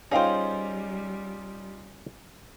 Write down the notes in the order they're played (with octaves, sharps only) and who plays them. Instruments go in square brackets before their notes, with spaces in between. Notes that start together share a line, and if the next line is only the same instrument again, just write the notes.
[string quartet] G3 [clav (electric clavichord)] C#4 F5 G5 [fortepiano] D#4 F4 [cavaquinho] G#4 C5